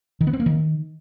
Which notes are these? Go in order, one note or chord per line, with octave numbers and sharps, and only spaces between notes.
D#3
B3
C4
A#3
D#3